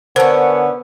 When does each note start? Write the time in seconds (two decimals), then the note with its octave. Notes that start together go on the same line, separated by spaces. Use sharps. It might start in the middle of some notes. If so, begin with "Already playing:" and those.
0.16 D3 B3 C#4 A#4 C5 A5